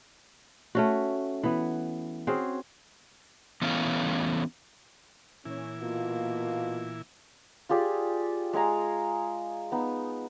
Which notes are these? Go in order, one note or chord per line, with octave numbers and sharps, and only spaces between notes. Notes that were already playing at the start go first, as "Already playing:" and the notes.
A3 C#4 F#4
E3 B3
C4 C#4 F#4 G#4
E3 A3 B3 C#4 E4 F5
A#2 E3 C#4 E4
B2 A#3 F4
F4 G4 G#4 D5
G#3 F5 G#5 A#5
B3 D#4